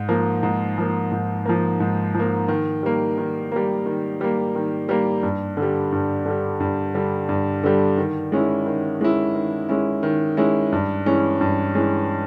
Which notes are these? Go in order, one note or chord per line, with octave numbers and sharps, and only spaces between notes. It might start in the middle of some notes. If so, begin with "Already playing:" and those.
Already playing: G#2
F3 A#3
G#2
F3 A#3
G#2
F3 A#3
G#2
F3 A#3
D#3
G3 A#3
D#3
G3 A#3
D#3
G3 A#3
D#3
G3 A#3
G2
D3
G3
G2
D3 G3
G2
D3 G3
G2
D3 G3
D#3
G#3 C#4 E4
D#3
G#3 C#4 E4
D#3
G#3 C#4 E4
D#3
G#3 C#4 E4
G2
E3 G#3 C#4
G2
E3 G#3 C#4